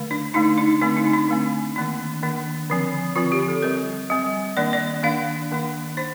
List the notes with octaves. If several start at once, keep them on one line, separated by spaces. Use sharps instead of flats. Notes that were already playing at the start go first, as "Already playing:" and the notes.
Already playing: D3 A3
D4
D3 A3 D4 D#4
D#4
D3 A3 C4 D4
D#4
D4
D3 A3 C4
D#3 A#3 D4
D#3 A#3 D4
D3 F3 C4
D3 F3 C4 F4
G4
A4
G3 C4 A#4
G3 C4
D#3 A#3 D4 D5
D5
D#3 A#3 D4 F5
D#3 A#3 D4
D4 C5